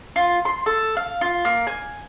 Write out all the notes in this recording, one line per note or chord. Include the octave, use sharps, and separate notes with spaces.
F4
C6
A4
F5
F4
A#3
G#5